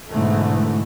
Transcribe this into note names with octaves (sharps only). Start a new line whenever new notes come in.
G#2 B2 D3 E3 A3